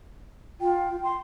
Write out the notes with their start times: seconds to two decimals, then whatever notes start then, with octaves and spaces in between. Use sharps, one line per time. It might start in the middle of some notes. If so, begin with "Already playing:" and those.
0.61 F4 G5
1.03 C6